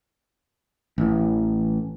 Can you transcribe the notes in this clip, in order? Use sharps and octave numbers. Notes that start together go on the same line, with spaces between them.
A1 E3